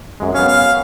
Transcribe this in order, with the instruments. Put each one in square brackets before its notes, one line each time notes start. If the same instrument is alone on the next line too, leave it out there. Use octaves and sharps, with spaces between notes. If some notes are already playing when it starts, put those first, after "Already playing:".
[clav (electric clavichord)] F#2 G#3
[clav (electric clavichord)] B3 C#4 [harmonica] F5
[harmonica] F5